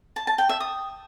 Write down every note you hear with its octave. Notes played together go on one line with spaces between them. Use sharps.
A5
A5
G5
E5
D#6